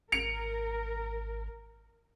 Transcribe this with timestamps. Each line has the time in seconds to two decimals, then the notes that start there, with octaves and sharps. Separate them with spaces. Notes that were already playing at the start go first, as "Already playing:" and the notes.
0.12 G#1 A#4 C#7 D7 F7